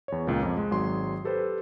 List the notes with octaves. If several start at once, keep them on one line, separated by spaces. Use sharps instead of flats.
E2 C#5
C#2 A#2
F2
G#3
G#1 F#3 G#4 C6
G4 A4 B4 C5